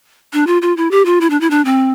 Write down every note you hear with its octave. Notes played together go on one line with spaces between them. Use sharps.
D4
F4
F4
E4
G4
F4
E4
D4
E4
D4
C4